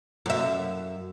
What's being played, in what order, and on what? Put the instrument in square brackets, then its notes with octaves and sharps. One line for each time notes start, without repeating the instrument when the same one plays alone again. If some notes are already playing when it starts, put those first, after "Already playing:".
[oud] F#2 E5